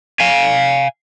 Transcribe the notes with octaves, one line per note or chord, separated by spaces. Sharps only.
F5 G#5